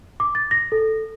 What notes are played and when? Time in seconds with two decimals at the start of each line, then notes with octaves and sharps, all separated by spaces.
0.20 D6
0.35 A6
0.51 A#6
0.72 A4